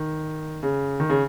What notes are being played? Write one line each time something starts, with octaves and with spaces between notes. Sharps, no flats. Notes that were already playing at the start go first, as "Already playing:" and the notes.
Already playing: D#3
C#3
D#3
C#3